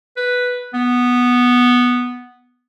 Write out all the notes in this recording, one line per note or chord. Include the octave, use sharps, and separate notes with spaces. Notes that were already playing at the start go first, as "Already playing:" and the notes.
B4
B3